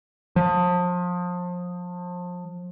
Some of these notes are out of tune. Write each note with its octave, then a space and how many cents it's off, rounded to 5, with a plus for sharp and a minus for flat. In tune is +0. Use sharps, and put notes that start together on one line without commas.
F3 +30